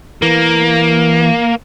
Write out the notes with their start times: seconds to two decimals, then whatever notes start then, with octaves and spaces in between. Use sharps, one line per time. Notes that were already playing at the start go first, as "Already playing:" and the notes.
0.22 E3 A#3